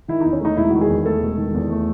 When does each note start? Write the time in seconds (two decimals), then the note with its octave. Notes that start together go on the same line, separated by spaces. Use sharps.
0.08 D#3 E4
0.21 E2 D#4
0.32 C#4
0.41 A3 D#4
0.57 E1 E4
0.70 D#3 F#4
0.81 G#4
0.89 E2
1.05 A3 A4
1.22 E1
1.38 D#3
1.54 E2
1.70 A3